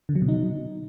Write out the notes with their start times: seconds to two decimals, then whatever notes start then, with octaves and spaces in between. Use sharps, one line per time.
0.09 D3
0.15 F#3
0.22 B2
0.28 D#4